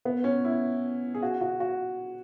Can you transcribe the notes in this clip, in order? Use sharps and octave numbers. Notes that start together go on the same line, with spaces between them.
B3
C#4
E4
G#4
F#4
F#4
F#4